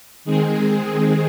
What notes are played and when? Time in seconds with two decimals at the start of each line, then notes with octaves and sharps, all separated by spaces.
0.25 D#3 G#3 C4 G#4
0.89 G#4